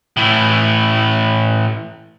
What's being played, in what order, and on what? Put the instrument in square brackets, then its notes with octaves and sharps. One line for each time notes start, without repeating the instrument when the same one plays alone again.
[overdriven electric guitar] A2 E3